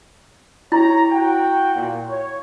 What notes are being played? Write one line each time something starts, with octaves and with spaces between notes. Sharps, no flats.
E4 G4 C#5 A#5
F#4 G5
A#2
C#5